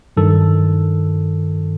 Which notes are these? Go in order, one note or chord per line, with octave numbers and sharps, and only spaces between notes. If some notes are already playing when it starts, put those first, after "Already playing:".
G2 D#3 F#3 A4